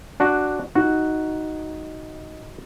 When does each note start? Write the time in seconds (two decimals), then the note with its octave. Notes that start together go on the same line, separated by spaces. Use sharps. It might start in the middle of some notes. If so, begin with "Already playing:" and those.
0.20 D4 F#4
0.75 D#4 F#4